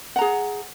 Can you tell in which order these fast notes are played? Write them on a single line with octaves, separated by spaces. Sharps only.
F#5 A#5 G#4